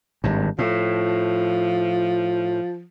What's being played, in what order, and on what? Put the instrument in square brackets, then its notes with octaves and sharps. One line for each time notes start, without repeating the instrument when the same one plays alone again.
[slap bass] G#1 G2
[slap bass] A2 [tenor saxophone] F3